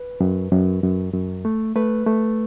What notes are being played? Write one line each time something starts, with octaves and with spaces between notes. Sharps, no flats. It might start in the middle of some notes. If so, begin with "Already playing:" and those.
Already playing: B4
F#2
F#2
F#2
F#2
A3
A3 B4
A3